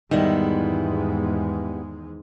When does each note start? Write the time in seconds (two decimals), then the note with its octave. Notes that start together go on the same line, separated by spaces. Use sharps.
0.11 E2 G#2 D#3 G3 G#3 B3 E4